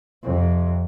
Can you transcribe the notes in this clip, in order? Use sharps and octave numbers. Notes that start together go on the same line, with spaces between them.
F2 C3